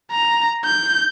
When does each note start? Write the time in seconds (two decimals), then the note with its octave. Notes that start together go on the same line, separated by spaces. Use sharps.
0.11 A#5
0.64 G6